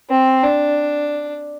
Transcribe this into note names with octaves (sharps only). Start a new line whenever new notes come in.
C4
D4